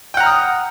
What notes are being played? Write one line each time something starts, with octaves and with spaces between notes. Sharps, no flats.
F#5 G5 A#5 D#6 F6